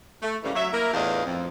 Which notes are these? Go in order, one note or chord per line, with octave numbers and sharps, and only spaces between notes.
A3
G#2 C#3 E3 G3 A3 A#3
F#3 E5
A#3 E4 A#4
E2 A2 E3 D4 F4 D#5
F2